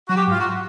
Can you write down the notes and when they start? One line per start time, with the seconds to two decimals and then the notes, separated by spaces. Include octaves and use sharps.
0.09 F#3 F#4
0.16 G4
0.27 G#2 F4
0.38 F#4